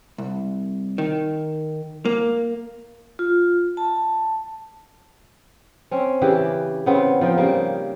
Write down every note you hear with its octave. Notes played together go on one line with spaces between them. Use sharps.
C2
D#3
A#3
F4
A5
C4 C#4
C#3 E3 G4
C#3 B3 C4
F3 D#4 G5
C#3 G3 A#3